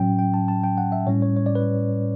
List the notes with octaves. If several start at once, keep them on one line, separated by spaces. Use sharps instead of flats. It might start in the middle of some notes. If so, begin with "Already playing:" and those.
Already playing: A2 F#3 C#4 G5
G5
A5
A5
G5
F#5
E5
A2 G3 C#4 C#5
C#5
C#5
D5
B4